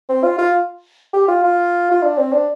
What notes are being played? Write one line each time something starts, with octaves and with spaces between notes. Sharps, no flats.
C4
F4
F4
G4
F4
F4
F4
D4
C4
D4